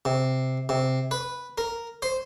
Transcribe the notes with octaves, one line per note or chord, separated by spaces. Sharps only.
C3
C3
B4
A#4
C5